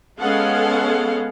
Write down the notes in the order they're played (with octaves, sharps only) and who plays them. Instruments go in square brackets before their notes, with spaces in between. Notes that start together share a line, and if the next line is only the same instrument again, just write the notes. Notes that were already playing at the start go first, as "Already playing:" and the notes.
[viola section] G#3 B3 C#4 A4 F5 F#5